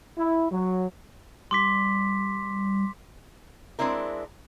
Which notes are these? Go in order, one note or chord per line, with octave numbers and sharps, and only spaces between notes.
E4
F#3
G3 C6 D6 B6
G#3 C4 D4 E4 A#4